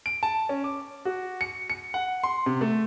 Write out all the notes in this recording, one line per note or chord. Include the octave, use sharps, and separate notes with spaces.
D7
A5
C#4
D6
F#4
C#7
C#7
F#5
C6
C3
A3